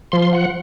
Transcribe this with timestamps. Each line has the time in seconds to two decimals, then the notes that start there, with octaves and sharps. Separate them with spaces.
0.12 F3 C6
0.33 F#5